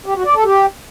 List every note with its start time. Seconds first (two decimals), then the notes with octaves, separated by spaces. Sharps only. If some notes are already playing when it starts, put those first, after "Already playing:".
0.06 G4
0.16 F#4
0.25 D5
0.35 A4
0.44 G4